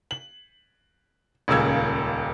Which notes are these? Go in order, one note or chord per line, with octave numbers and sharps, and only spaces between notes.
F#7
D#1 C#2 A#2 C#3 E6 G#6